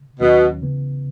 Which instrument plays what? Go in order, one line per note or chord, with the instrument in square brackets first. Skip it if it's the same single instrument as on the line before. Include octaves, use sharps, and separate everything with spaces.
[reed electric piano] D#2 D#3 F#3 C#4 [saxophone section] B2
[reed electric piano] C#3 E3 B3